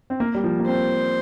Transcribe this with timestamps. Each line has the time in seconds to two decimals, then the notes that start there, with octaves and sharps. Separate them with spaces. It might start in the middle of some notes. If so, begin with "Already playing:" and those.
0.10 C4
0.20 A#3
0.35 G3
0.44 F3
0.60 A#3
0.66 C4 C5